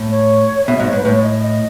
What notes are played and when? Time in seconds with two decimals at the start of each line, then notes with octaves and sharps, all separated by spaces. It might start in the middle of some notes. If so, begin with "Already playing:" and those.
Already playing: A2
0.11 C#5
0.67 B2 E5
0.77 G#2 D#5
0.87 C#5
0.93 G#2 B4
1.05 A2 C#5
1.23 D#5
1.43 D#5